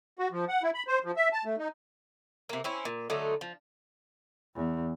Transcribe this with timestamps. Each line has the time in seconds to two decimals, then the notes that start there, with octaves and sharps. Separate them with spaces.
0.19 F#4
0.32 F3
0.49 F#5
0.63 E4
0.74 B5
0.88 C5
1.04 F3
1.16 E5
1.33 A5
1.45 A3
1.59 D#4
2.49 C3 A#3
2.64 C4 C#4 E4
2.85 A#2
3.10 D3 F#3 A3 D#4
3.41 F3
4.55 E2